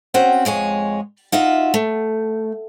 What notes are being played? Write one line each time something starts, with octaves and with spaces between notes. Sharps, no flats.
C4 C#4 F#4 G5
F2 G#3 C#5 G#5
D#4 F4 F#4 E5
A3